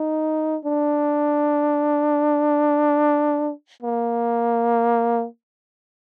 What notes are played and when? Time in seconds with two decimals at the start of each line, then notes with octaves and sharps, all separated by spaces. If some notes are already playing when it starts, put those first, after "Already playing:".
Already playing: D#4
0.65 D4
3.83 A#3